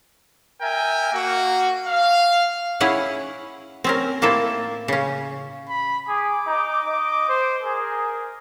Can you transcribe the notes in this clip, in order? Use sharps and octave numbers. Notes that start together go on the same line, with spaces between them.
A#4 E5 G5 G#5
A#3 F#4
F5
C#4 E4 G#4 F#5
C4 C#4 A#4
A2 A#3 C4 E4 A4
C#3 C#4
B5
G#4 D6
D#4
D#5
C5
G#4 A#4